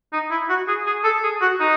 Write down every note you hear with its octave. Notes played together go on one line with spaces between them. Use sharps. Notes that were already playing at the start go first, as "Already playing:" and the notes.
D#4
E4
F#4
G#4
G#4
A4
G#4
F#4
D#4